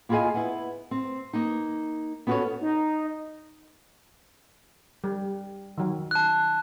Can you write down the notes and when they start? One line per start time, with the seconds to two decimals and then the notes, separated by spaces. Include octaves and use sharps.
0.09 A#3 E4 F4 G#4 D#5 G#5
0.34 B3 E4
0.91 C4
1.33 A#3 D#4
2.27 B3 C#4 F#4 G#4 A4 C#5
2.61 D#4
5.04 G3
5.78 D#3 F#3
6.11 A5 F#6